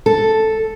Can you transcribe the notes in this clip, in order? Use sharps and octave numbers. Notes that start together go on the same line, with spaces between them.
A4